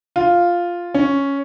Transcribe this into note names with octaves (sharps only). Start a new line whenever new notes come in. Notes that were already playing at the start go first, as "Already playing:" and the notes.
F4
C#4